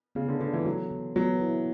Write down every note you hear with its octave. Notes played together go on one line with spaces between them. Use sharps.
C#3 B3
D3
D3 A4
E3
E3 F#3
E3
F#3 B3
E4